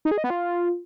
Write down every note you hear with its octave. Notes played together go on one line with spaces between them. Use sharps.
D#4
G#4
D#5
B3
F4